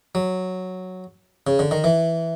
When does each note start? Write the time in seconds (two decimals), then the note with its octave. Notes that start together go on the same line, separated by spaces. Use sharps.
0.15 F#3
1.47 C#3
1.59 D3
1.71 D#3
1.84 E3